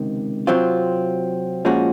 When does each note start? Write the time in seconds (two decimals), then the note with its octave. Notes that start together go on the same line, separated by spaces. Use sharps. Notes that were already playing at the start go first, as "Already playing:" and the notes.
Already playing: C#2 C3 D#3
0.47 C3 F#3 C4 F4
1.65 A#2 F3 G#3 C#4 F#4